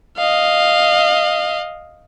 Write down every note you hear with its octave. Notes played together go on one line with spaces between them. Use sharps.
D#5 F5